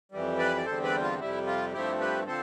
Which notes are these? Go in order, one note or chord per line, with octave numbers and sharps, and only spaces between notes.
F2 E3 G3
B4 D5
D5
E2 D3 G3 C4 A4 C5
B4 D5
F4
F2 C3 G3 E4
F4
G2 F3 A3 C4 E4 G4
G4 B4
D3 F3 C4 A4 C5